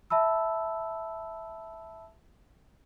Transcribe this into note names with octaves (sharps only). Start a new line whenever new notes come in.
E5 A5 B5 E6